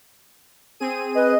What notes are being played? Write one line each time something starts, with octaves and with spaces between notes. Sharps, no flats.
C4 G#4 D#7
B4 D#5